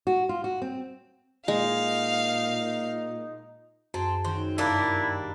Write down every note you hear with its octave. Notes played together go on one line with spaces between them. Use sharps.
F#4
F4
F#4
C4
A#2 G#3 D#4 F5
F#2 C4 G#4 A5
D#3 C4 C#4 F#4
C2 G2 G3 A#3 D4 E4